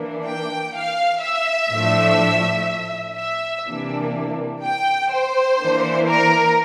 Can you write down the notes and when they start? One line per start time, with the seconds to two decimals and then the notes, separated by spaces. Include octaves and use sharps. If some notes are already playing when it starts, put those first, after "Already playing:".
Already playing: E3 A#3 D4
0.27 G5
0.75 F5
1.23 E5
1.72 A2 F3 A3 D4
3.17 E5
3.66 C3 E3 A#3 D4
4.63 G5
5.11 C5
5.59 E3 A#3 D4
6.07 A#4